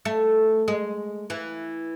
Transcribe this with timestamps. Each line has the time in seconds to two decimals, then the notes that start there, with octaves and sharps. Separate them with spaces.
0.05 A3
0.68 G#3
1.30 E3